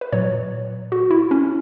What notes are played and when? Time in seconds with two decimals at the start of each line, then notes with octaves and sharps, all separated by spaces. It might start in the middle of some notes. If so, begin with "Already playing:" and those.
0.01 B4
0.12 A#2 F#3 C#5
0.92 F#4
1.11 E4
1.31 C#4